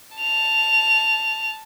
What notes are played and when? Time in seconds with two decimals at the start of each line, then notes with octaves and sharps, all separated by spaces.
0.17 A5 F7